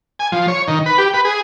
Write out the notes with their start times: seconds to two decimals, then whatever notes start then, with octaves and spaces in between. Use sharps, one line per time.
0.19 G#5
0.32 F3
0.48 C#5
0.68 D#3
0.86 B4
0.98 G4
1.14 B4
1.25 G#4